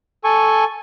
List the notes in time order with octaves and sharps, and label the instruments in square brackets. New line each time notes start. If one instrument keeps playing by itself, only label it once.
[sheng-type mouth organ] A4 G#5 C#6